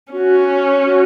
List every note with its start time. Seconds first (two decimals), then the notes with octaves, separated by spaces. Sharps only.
0.12 C#4 F#4
0.85 F#4